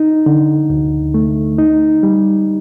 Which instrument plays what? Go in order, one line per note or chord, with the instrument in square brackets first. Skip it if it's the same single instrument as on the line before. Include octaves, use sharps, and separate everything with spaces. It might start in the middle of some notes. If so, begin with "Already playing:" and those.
Already playing: [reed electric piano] D#4
D3
D2
A3
D#4
G3